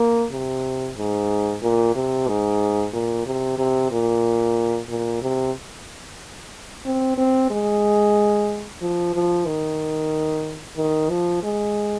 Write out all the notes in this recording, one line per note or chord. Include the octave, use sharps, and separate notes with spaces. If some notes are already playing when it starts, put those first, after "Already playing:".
Already playing: A#3
C3
G#2
A#2
C3
G#2
A#2
C3
C3
A#2
A#2
C3
C4
C4
G#3
F3
F3
D#3
D#3
F3
G#3